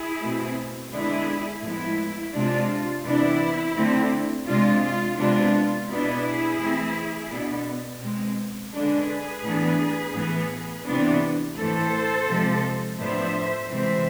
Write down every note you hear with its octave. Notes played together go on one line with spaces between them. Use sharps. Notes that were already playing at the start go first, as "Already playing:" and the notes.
Already playing: E4 G#4
B2 A3 C4
D3 G#3 B3 D4 E4 G#4
A2 F3 G#3 B3 E4
C3 G#3 D4 F4
C3 E3 B3 D4 E4
D3 A3 C4
C3 G#3 D4 F4
F4
C3 G#3 B3 D4 F4
B2 B3 D4 E4 G#4
E3 A3 C4
B2 B3 D4
B2 G#3 C4
D3 G#3 D4 G#4 B4
A2 E3 B3 D4
A2 E3 B3
C3 E3 B3 D4
A2 E3 A3 A4 C5
C3 F3 G#3
A2 F3 B3 D4 C5 E5
C3 E3 G#3 C4 C5 E5